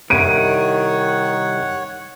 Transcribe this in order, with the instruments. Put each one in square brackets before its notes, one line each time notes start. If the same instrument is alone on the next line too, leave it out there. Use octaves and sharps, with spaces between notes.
[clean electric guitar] C2 [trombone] D#3 [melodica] C#5 F#5 [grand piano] D7 D#7